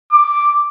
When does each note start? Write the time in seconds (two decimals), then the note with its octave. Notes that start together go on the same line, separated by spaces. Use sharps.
0.12 D6